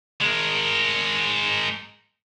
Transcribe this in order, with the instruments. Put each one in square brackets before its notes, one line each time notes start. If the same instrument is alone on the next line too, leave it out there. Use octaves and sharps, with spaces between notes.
[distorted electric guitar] G#3 A#4